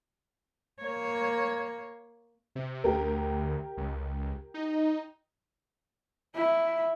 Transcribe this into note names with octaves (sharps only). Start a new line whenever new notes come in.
A#3 C#5
C3
D2 G4 A#4
C#2
D#4
E4